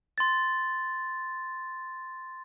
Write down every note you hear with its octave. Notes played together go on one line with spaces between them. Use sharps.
C6 A6